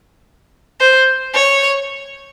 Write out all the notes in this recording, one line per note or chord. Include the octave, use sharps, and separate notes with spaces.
C5
C#5